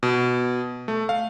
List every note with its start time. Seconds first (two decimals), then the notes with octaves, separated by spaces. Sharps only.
0.03 B2
0.88 A3
1.09 F5